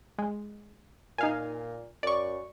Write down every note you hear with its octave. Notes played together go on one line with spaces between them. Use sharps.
G#3
A#2 D#4 F5 G#5
F#2 D5 C#6